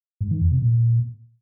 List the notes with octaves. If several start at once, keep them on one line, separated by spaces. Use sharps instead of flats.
G#2
D#3
F2
C3
A#2